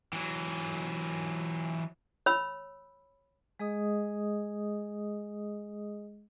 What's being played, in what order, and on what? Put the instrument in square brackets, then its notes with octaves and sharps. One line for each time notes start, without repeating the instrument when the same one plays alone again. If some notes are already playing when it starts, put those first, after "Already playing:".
[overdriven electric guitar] E3 F#3
[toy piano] C#5 B5 E6
[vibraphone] G#3 G#4 D#5 D#6